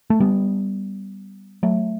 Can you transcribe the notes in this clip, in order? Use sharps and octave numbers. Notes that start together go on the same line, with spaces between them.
A3
G3 B3
F#3 A3